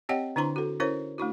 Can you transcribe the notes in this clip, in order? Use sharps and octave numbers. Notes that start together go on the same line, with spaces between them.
C4 G4 C#5 D#5 F#5 G5
D3 D4 E4 C5 A#5 C6
F#4 A4
C#4 E4 A#4 C5 C#5
A3 D4 E4 F#4